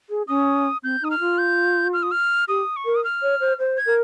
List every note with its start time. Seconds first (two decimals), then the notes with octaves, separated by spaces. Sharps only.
0.09 G#4
0.28 C#4 D#6
0.83 C4 G6
1.02 D#4 D#6
1.11 F6
1.20 F4
1.38 G6
1.93 F6
2.03 D#6
2.11 F6
2.48 G4 D#6
2.76 C#6
2.85 A#4
2.95 D#6
3.04 F6
3.22 C#5
3.40 C5
3.59 C5
3.77 G#6
3.86 A#4